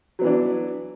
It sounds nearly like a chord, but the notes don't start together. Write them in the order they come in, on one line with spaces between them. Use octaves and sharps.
F#3 B3 E3 D4